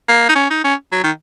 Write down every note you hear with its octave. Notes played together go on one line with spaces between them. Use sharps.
A#3
D#4
C#4
D#4
C#4
F#3
D#3